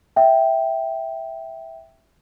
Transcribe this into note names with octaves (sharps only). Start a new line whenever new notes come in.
E5 G5